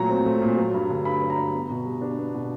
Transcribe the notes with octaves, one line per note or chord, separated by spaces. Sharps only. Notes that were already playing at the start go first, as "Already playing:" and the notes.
Already playing: A#2 F#3 A3 A#5
C4
A3
A#2
F#3
G2
D3
G2 B5
F#3
A#5
G2
B3
B2
G3
D4
B3
B2